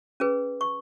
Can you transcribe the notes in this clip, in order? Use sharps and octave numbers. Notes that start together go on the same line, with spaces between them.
C#4 G#4 B4
C#6